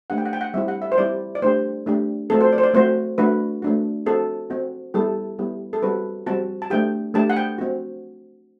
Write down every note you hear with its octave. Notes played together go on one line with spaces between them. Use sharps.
A3 D4 G4 F#5
G5
F#5
G5
F#5
G3 C4 E4 G4 E5
F#5
E5
C5
G3 C4 E4 G4 D5
D5
A3 D4 G4 C5
A3 D4 G4
A3 C4 F#4 A4
C5
D5
C5
D5
A3 C4 F#4 C5
A3 D4 F#4 B4
A3 D4 F#4
C4 F#4 A4
C4 F#4
G3 B3 E4 G4 A4
G3 B3 E4 G4
A4
G3 C4 F#4 B4
G3 C4 F#4 A5
A5
A3 D4 G4 G5
A3 D4 G4 A5
F#5
G5
C4 F#4